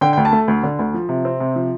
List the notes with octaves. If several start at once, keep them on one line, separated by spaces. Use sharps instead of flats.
D3 G5
D2 G5
A5
A3
D2
D3
D2
F3
C3
C4
C3
F3